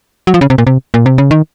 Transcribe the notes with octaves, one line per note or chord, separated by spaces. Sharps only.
F#3
F3
C#3
C3
A#2
C3
A#2
C3
C#3
D#3